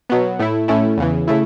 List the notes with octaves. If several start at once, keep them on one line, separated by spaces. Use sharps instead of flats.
B2 F#3 B3
A2 A3 E4
A2 A3 C#4 E4
E2 C#3 E3
C#3 A3 E4